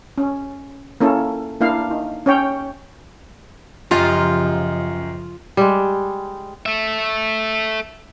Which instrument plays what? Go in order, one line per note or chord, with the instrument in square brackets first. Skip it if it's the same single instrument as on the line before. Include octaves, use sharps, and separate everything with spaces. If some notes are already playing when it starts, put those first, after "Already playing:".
[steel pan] C#4
A#3 C#4 E4 A4
A#3 D4 E4 F5
D#4
C#4 C#5 G5
[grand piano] F#2 [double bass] C#3 F3 [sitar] F4 [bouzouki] G4 D#5 A#5
[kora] G3 G#3
[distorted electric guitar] A4 E5